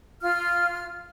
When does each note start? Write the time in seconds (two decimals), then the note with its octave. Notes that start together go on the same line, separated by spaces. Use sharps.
0.22 F4 F6